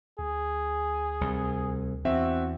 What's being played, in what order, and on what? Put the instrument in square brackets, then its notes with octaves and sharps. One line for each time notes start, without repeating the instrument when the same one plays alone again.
[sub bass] D2 [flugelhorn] G#4
[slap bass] C2
[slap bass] E2 [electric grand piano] C4 E5 [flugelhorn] F#4